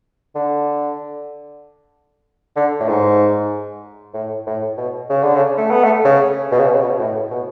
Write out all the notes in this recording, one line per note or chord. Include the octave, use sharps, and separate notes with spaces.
D3
D3
A2
G#2
A2
A2
B2
C#3
D3
C#3
A3
B3
A3
C#3
B2
C#3
B2
C#3
B2
A2
B2